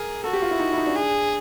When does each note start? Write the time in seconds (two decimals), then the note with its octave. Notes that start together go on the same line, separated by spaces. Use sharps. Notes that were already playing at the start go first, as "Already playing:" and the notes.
Already playing: G#4 A#4
0.24 F#4 A4
0.33 G4
0.42 F4
0.51 E4
0.60 D#4
0.73 E4
0.78 D#4
0.87 D4
0.95 G#4